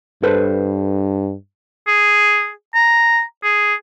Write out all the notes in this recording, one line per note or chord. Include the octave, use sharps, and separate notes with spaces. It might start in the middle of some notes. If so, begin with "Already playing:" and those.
G2 A4 B4 C5
G#4
A#5
G#4